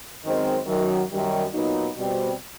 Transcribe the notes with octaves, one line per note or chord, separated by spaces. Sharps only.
F#2 D#3 G#3 C4
F#2 D#3 F#3
F#2 D#3 G3
A#2 F#3 B3 D#4
B2 G3 C4